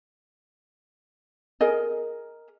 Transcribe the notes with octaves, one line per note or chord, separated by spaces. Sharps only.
G#4 A#4 D#5